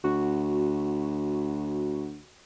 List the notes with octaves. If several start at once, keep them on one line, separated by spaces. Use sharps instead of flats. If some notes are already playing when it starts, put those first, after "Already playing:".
D2 F#4